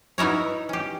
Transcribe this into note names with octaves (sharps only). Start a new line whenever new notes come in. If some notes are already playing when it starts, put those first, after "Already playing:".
B3 D#4 E4 A#4 C#5
C#4 G4